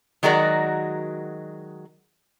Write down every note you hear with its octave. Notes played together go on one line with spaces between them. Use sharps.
D#3 F#3 G#3 F#4 A#4 D5